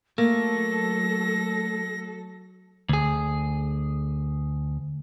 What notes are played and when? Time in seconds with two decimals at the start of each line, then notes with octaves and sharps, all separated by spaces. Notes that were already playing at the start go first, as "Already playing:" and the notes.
0.18 F#3 A3 A#3 A4 A#6
2.89 D2 G#4